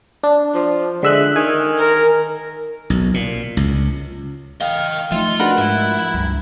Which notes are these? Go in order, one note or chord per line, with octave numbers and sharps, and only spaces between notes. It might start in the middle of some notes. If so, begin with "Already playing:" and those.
D4
F3
D3 G#3 E5 F#6
D#3 G#5
A#4
B1
A#2
C#2
D#5 F5 G5
F3 A3 D#4 F4 E5
D4 D#4 F#4 A#4 B4
G#2 E4 E5
C#2 G2